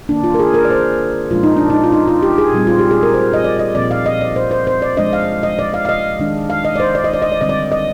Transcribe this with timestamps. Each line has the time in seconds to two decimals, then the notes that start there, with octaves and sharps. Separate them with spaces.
0.09 D#3 A#3 D4
0.24 F4
0.34 A#4
0.40 G#4
0.54 A#4
0.65 D5
0.71 C5
1.30 A#2 F3 G#3 D4 F4
1.43 D#4
1.57 D4
1.70 D#4
1.84 F4
1.92 D#4
2.08 F4
2.23 G4
2.38 G#4
2.53 A#2 G3 C4
2.67 F4
2.79 G4
2.91 G#4
3.03 A#4
3.14 C5
3.34 D#5
3.44 D5
3.59 D#5
3.75 A#2 F3 C4 D5
3.91 F5
4.06 D#5
4.21 D5
4.36 C5
4.51 C5
4.67 C5
4.82 D5
4.97 F3 G#3 D4 D#5
5.13 F5
5.43 D#5
5.59 D5
5.74 F5
5.85 F5
5.89 D#5
6.20 D#3 G#3 D4
6.50 F5
6.65 D#5
6.76 D5
6.80 C5
6.95 D5
7.04 D#5
7.13 D5
7.22 D#5
7.32 D5
7.41 D3 G3 C4 D#5
7.49 D5
7.72 D#5